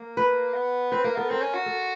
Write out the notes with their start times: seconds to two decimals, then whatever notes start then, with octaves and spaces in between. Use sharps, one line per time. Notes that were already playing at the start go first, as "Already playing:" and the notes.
Already playing: A#3
0.17 B4
0.54 B3
0.92 C4 B4
1.04 A#3 A#4
1.16 B3 A4
1.29 C4 A#4
1.42 C#4
1.54 F#4
1.66 A4